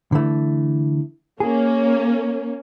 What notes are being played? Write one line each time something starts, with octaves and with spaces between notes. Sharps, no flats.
D3 E3 A3
A#3 C#4 G#4